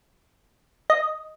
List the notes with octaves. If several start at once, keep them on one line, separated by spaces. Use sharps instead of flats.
D#5